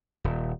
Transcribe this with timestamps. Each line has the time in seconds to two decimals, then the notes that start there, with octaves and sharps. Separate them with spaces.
0.24 D#1